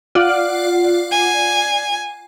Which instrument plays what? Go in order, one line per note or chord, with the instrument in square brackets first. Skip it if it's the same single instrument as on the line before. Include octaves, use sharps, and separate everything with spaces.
[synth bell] F4 D5 F#5
[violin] G#5